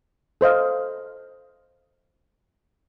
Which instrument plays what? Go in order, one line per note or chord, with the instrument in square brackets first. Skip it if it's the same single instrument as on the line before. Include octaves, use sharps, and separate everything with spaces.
[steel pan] A4 C5 D#5 F5